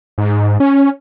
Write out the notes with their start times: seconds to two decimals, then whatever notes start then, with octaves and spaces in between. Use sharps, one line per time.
0.18 G#2
0.60 C#4